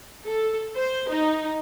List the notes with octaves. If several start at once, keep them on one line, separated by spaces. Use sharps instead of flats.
A4
C5
D#4